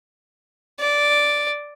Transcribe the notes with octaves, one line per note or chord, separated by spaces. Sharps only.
D5